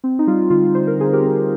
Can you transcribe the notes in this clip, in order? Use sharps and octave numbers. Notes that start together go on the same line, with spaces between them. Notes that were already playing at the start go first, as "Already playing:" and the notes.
C4
D#4
G3 F4
D3 F4
D3 C5
A#4
D3 G#4
G4 A#4
C4